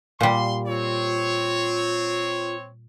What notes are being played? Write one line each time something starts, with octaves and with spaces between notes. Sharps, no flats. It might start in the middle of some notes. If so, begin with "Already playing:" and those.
A#2 G3 C6
C4 F4 C#5